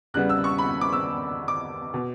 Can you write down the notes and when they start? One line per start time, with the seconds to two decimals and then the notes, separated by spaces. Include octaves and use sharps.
0.14 E2 C#3 G3 B3 F#6
0.29 E6
0.44 C#6
0.58 B5
0.81 D6
0.93 E6
1.48 D6
1.94 B2